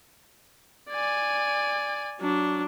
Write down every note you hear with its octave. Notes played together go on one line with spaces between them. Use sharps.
D5 G#5
F#3 D4